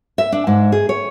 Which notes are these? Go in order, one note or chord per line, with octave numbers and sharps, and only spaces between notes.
E5
D4
G#2
G#4
C#5